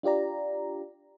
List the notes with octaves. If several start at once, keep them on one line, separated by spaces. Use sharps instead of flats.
D4 F4 G4 D5 A#5